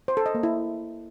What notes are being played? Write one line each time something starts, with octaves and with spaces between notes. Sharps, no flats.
C5
A4
D#5
A#3
E4